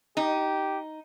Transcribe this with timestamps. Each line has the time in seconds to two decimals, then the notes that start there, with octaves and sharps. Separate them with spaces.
0.17 D#4 G4